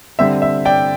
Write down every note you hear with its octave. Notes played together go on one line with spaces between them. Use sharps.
D3 G3 C4 E5
E5
D5 G5